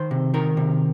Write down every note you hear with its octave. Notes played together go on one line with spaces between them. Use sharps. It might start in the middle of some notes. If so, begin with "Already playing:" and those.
Already playing: D#3 C5
C3
D#3 A#4
C3